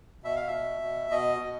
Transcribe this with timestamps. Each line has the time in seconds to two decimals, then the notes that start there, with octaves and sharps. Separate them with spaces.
0.24 B2 E5
0.36 F5
0.48 E5
0.53 B2
0.81 B2
1.10 B2 D#5
1.39 B2